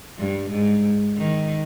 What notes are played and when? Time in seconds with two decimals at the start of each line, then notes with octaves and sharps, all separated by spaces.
0.18 G2
0.51 G#2
1.17 D#3